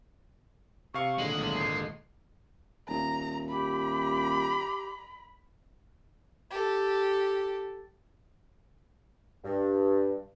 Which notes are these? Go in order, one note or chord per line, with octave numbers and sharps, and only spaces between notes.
C3 F5 C#6
D#2 A#2 D3 G#3 F#7
B1 A2
G#1 C7
D#1 A#5
G4 B5
G4 A4
G2